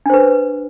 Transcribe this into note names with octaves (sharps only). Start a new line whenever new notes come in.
D4 B4 C5